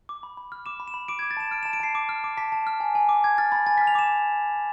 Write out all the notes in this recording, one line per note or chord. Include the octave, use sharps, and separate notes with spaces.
D6
B5
B5
F6
D6 E7
B5
E7
B5
D6 D7
G#6
D6
A6
A5 E7
F6 D7
E7
A5
D7
A5 C7
D6
F6
D6
A5 B6
A5
F6
G#5
G#5
D6
D6 G#6
F6 A6
B5 A6
G#5 A6
B6
F6
F7
D6 E7